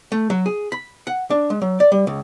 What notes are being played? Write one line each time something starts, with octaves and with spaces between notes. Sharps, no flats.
A3
F#3
G#4
B5
F#5
D4
G#3
F#3
D5
G3
C#2